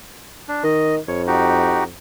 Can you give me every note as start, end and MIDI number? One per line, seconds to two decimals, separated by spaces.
0.48 0.63 62
0.64 0.98 51
0.64 0.95 75
1.08 1.95 41
1.08 1.22 73
1.27 1.84 63
1.27 1.84 66
1.27 1.84 67